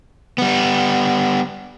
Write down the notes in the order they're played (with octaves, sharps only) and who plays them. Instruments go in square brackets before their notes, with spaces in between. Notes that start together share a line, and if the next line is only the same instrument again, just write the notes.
[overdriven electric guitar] G3 B3